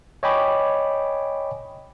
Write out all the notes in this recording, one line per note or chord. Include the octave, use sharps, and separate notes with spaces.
C#5 D#5 G5 G#5 B5 D6